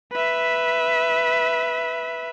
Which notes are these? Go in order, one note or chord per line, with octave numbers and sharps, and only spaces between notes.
B4 E5